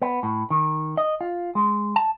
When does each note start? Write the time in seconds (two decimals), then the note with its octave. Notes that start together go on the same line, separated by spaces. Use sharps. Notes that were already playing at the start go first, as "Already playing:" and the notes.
0.02 B3
0.23 A2
0.50 D#3
0.97 D#5
1.21 F4
1.55 G#3
1.96 A5